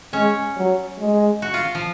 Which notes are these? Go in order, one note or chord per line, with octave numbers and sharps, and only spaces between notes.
G#3 C#4
F#3
G#3
F#4
F4
F3